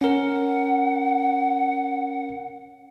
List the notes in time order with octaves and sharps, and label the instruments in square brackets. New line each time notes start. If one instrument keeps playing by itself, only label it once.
[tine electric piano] C#4 A#4 [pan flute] F#5